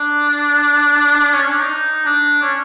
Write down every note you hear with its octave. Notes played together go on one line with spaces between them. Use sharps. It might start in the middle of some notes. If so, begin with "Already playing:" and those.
Already playing: D4
C#4
D4
D#4
D4
C#4